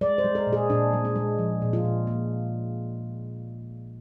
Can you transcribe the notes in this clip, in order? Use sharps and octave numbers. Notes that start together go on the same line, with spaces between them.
G#3 D5
C5
G#3
A#4
A#2
G#4
A#2 D4
G#3
D4
G#3
F3
A#2
F4
A#2
A#3